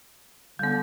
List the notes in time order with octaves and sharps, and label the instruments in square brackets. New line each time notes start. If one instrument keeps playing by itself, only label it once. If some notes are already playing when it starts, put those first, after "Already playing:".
[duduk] D3 [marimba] G3 B3